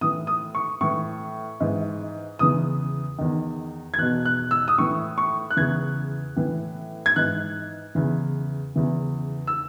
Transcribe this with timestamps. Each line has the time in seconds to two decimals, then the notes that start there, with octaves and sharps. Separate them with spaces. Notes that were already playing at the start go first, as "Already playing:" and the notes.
0.01 A2 E3 D#6
0.27 D#6
0.55 C#6
0.81 A2 E3 C#6
1.60 G#2 E3
2.39 E2 C#3 E3 D#6
3.18 E2 D#3
3.94 G#6
3.98 E2 B2 F#6
4.25 F#6
4.51 E6
4.68 D#6
4.78 A2 E3 C#6
5.18 C#6
5.51 F#6
5.57 E2 C#3 E3 G#6
6.36 A2 E3
7.06 G#6
7.16 G#2 E3 F#6
7.95 E2 C#3 E3
8.76 E2 C#3 E3
9.47 E6